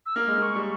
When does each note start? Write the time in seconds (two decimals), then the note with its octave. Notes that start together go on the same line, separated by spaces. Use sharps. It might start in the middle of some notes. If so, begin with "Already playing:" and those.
0.06 E6
0.16 A#3 F6
0.27 G#3
0.38 A#3 C#6
0.55 G3